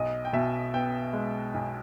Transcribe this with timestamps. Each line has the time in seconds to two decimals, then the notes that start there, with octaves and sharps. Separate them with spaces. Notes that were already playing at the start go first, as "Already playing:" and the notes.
Already playing: B1 D#5
0.25 G5
0.33 B2 E5
0.74 B3 G5
1.13 G#3
1.54 B1